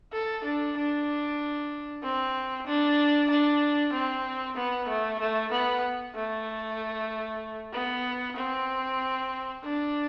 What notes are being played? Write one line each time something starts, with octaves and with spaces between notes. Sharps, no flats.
A4
D4
D4
C4
D4
D4
C4
B3
A3
A3
B3
A3
B3
C4
D4